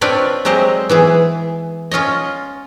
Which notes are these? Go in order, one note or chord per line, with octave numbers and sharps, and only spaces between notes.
C4 D4 F4 B4 C#5 D5
F#3 G#3 C4 G4 C5 D#5
E3 B3 G#4
C#4 F4 C#5 D#5